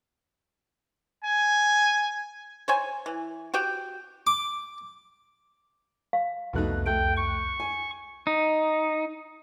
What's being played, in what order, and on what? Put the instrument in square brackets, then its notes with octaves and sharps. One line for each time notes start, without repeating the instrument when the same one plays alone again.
[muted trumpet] G#5
[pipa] C5 C#5 G#5
E3
F#4 G4 G5
[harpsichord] D6
[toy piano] F5
[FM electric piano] C2 F2 F#6 [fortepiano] B2 A3 D#4
[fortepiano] A3 [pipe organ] G5
[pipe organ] C#6
[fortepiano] G#5
[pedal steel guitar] D#4